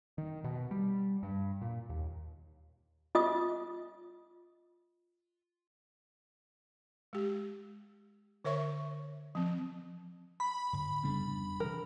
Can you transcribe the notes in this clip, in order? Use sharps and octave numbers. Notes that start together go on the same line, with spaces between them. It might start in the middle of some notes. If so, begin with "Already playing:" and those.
D#3
B2
G3
G2
A#2
D#2
F4 D#5 D#6
G#3 G4
D3 A#4 C#5 E5 C#6
F3 C4
B5
G#2 D3
F1 C#3 G3 B3 D4
C3 E3 A#4